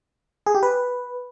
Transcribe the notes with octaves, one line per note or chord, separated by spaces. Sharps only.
G#4
G4
B4